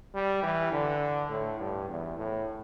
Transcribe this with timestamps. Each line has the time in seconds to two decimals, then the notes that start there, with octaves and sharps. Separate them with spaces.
0.14 G3
0.43 E3
0.72 D3
1.30 A2
1.60 G2
1.89 E2
2.18 A2